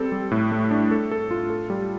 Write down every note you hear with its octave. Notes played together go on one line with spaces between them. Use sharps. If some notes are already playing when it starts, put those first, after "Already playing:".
Already playing: G3 C4 A4
G3
A2
A3
D4
A4
A4
F4
A4
G3